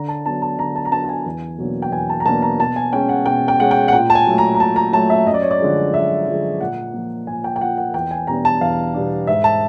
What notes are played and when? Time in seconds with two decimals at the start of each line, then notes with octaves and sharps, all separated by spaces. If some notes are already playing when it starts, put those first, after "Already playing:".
Already playing: D3 A#5
0.08 A5
0.26 F#3 B3 D4 A5
0.42 A5
0.58 D3 A#5
0.76 A5
0.85 A#5
0.92 F#3 B3 D4 A5
1.04 A5
1.09 G#5
1.26 E2
1.58 B2 F#3 A#3 D4
1.82 G5
1.92 E2 G#5
2.09 A5
2.20 A#5
2.26 B2 F#3 A#3 D4 A5
2.42 A#5
2.59 B2 A5
2.76 G#5
2.93 G#3 C#4 G5
3.09 F#5
3.26 B2 G5
3.48 G5
3.60 G#3 C#4 F#5
3.71 G5
3.88 F#5
3.93 A#2 G5
4.10 A5
4.15 G#5
4.27 F#3 A3
4.38 A#5
4.55 A#5
4.59 A#2 A5
4.76 A#5
4.93 F#3 A3 A5
5.10 E5
5.27 F#2 D#5
5.34 D5
5.42 C#5
5.51 D5
5.61 D3 F3 G#3
5.93 F#2 E5
6.27 D3 F3 G#3
6.61 A#2 F#5
6.93 F3 A#3
7.27 A#2 G#5
7.44 G5
7.56 G5
7.61 F3 A#3 F#5
7.78 F#5
7.94 E2 G5
8.11 G#5
8.27 B2 G3 B3 D4 A#5
8.45 A5
8.61 E2 F5
8.94 B2 G3 B3 D4
9.27 G#2 E5
9.44 A5